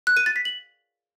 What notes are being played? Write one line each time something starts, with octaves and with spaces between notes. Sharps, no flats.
F#6
D#7
A6
B6
F#7